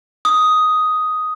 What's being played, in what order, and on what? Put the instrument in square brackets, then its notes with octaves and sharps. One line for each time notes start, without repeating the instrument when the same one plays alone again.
[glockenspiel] D#6